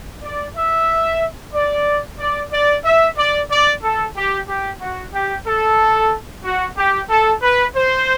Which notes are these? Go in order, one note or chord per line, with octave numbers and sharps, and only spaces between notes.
D5
E5
D5
D5
D5
E5
D5
D5
A4
G4
G4
F#4
G4
A4
F#4
G4
A4
B4
C5